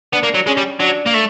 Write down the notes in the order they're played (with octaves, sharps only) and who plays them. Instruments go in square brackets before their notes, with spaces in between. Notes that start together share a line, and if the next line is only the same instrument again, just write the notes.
[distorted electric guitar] B3 [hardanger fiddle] D4
[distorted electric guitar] A#3
F#3
[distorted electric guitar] G#3 [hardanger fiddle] C#4
[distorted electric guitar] G3
[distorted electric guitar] F#3 [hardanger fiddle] D4
[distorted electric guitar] A#3
A3